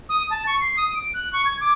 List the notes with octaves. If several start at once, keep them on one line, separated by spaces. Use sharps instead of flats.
D#6
A5
C#6
C7
D#6
D7
F#6
C#6
G#6
D6